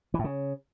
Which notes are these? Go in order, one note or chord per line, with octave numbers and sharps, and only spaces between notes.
E3
A2
C#3